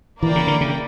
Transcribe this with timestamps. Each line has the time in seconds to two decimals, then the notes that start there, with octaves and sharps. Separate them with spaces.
0.21 E3 A#3 E4 A#4 D5 G5
0.36 C#3
0.47 D3
0.61 C#3